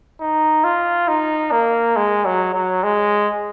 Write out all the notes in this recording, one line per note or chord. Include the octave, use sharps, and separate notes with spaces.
D#4
F4
D#4
A#3
G#3
F#3
F#3
G#3